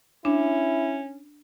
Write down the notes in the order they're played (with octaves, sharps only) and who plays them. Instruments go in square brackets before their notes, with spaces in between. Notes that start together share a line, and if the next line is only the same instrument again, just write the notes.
[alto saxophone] C#4 [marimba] D4 [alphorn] E4